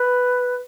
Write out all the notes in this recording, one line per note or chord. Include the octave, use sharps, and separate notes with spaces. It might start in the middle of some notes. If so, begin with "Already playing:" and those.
Already playing: B4